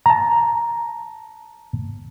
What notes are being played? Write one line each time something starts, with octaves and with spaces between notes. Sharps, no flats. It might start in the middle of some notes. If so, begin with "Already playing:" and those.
A5 A#5